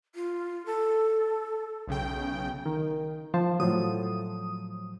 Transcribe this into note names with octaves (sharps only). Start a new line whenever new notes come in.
F4
A4
B1 C#3 G5
D#3
F3 C5 A5
A2 F3 F#3 D#6